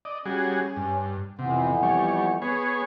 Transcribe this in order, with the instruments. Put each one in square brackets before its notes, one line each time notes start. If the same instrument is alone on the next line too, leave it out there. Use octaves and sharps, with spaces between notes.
[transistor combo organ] D5 D#5
[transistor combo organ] G3 F#4 G#4 [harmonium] C#4
[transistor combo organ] G2
[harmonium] F2 E3 B3 [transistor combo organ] C3
[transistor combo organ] G3 C#5
B3 G#4 C#5